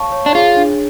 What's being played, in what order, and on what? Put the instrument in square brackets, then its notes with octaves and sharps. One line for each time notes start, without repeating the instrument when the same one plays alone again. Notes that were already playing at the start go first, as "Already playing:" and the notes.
Already playing: [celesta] C#5 F5 A5 C#6
C#5
[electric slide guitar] D4
[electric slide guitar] F4 [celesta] G#4
[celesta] D4